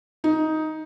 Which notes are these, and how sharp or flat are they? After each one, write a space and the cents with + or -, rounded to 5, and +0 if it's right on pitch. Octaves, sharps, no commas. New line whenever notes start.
D#4 +10